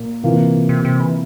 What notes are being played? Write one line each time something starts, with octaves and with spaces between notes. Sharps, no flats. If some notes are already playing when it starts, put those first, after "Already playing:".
Already playing: A#2 A#3
C3 E3 A#3 F4
C3
C3
E3